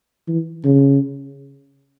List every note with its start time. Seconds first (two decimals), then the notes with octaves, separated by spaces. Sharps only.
0.28 E3
0.65 C#3